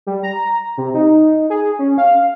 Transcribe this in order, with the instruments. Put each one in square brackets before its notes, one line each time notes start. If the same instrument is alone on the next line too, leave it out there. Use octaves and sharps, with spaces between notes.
[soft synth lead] G3
A#5
C3
D#4
G#4
C#4
F5